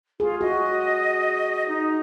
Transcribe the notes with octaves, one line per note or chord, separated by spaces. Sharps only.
F4 G#4
F#4 D#5
D#4